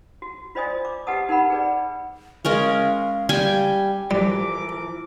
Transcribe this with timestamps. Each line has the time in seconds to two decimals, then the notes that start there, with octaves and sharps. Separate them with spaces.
0.22 F#4
0.55 F4 C5 D5 D#5 G#5 D#6
0.85 D6
1.07 G4 B4 D#5 F#5 A5 D#6
1.29 D#4 A#4 F#5 B5
1.50 G#4 B4 D5
2.45 G#3 C#4 A#4 F5
3.29 G3 G5 G#5
4.11 E3 F3 G3 A4 A#4 D6